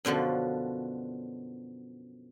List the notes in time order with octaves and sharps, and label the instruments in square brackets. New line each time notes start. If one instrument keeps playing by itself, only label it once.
[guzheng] F#2 B2 D3 F3